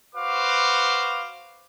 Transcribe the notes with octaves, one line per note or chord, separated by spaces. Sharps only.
F#4 B4 C5 F5 D6